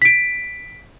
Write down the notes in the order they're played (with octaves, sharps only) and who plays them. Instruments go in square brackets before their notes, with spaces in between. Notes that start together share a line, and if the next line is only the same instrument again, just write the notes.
[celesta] B6 D7